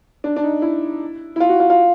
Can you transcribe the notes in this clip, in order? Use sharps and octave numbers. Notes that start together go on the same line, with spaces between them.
D4
D4
D#4
E4
E4
F4
F#4
F4
F4